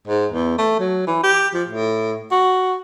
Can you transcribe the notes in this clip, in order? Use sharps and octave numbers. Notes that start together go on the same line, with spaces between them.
G#2
E2
A3
F#3
E3
G4
F3
A2
F#4